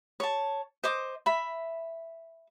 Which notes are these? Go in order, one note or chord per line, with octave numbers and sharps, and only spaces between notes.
C#5 A5
C5 D#5 D6
E5 B5